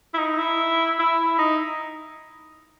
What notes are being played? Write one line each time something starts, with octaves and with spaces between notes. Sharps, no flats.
E4
D#4
E4
E4
D#4